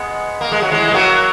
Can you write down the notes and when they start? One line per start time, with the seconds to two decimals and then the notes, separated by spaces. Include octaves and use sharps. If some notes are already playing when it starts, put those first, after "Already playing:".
Already playing: G#3 B3
0.41 A#3
0.52 G#3
0.62 F#3
0.71 E3 G#3
0.88 G#3
0.93 F#3 A#3